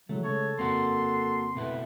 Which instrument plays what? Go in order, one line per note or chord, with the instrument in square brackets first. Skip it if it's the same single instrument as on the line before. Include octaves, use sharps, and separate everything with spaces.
[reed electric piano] C#3 E3 G#3 [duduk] F#3 [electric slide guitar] A3
[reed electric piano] C#3 G#3 [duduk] A4 [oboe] C#5
[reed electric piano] F2 C#3 C4 [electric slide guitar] A#3 F#4 [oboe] C6
[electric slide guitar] B2 A3 E4 [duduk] B4